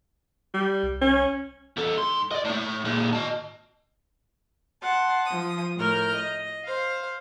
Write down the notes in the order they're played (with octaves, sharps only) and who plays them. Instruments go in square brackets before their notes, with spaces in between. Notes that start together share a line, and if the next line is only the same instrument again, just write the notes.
[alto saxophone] G3
[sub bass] C2
[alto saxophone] C#4
[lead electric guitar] E2 A4
G#2 C6
D5 D#5
A2 A3
A#2 G#3
D#5 A5
[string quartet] F#5 A5 C6
F3 D#6
A2 A#4 F6 G6
D#5
C5 F5